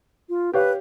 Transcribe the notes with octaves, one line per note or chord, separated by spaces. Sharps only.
F4
G4 B4 C#5 F5